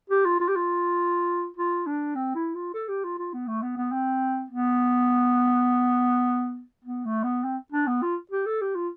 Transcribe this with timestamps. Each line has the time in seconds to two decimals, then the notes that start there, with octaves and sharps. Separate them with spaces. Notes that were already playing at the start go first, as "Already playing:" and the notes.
0.10 G4
0.25 F4
0.40 F4
0.48 G4
0.56 F4
1.57 F4
1.87 D4
2.15 C4
2.35 E4
2.55 F4
2.74 A4
2.89 G4
3.04 F4
3.18 F4
3.34 B3
3.47 A3
3.62 B3
3.77 B3
3.92 C4
4.50 B3
6.84 B3
7.05 A3
7.24 B3
7.44 C4
7.72 D4
7.87 B3
8.02 F4
8.32 G4
8.46 A4
8.61 G4
8.75 F4